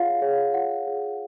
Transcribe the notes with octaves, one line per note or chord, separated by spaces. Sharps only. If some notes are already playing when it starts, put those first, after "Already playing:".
Already playing: F4 G#4 C#5 F5 F#5
G#4 C#5
F4 F#5
G#4 C#5